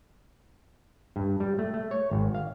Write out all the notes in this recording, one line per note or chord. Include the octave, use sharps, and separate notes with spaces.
G2
G3
A3
A3
C#5
G#1
F5